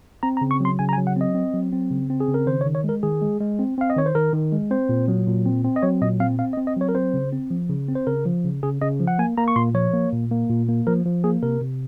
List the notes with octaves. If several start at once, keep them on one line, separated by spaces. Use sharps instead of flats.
C4 A#5
A#5
C#3
C#6
F#3 C6
C#3 G#5
A#5
G#5
F#3
F#5
C4 D#5
C4
F#3
C4
C#3
C4
G#4
C#3
A#4
D#3 C5
C#5
D#3
C#5
G#3 A#4
D#3 G#4
G#3
G#3
C4
C4 F5
D#5
D#3 C#5
C5
D#3 A#4
D#3
G#3
C4 C5
A#2
F#3
A#2
C4
C4
D#5
F#3 C#5
A#2 D#5
C4 F5
C4 F5
D#5
C4
D#5
F#3 C#5
A#4
C4 C5
C#3
C4
F3
C#3
C4
C5
C#3 A#4
F3
C#3
C#3 G#4
C#3 D#5
F3
F#5
A#3 G#5
A#3 A#5
C#6
A#2 C6
F3 C#5
A#3
A#2
A#3
A#2
A#3
F3 A#4
F3
A#3 G#4
C3 A#4
C3